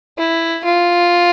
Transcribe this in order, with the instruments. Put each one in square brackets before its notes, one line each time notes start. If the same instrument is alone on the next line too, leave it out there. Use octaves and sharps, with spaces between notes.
[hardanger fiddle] E4
F4